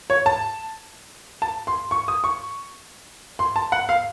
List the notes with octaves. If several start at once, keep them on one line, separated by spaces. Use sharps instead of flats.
C#5
A5
A5
C6
C#6
D#6
C#6
C6
A5
F#5
F5